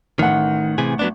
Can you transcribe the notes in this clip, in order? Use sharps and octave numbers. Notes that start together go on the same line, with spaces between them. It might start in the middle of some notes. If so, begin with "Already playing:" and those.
A1 D#3 F#5
C3 E3 G#4
F#3 B3 D4